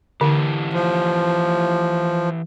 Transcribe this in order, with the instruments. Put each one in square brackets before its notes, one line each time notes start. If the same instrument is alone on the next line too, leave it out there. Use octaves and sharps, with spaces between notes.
[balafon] D3 [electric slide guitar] E3 E4 G4
[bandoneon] F3